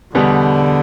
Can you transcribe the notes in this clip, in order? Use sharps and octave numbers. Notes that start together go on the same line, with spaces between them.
E2 B2 D3 G3 B3